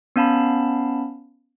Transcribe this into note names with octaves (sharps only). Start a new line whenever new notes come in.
B3 C#4 F5 A5 B5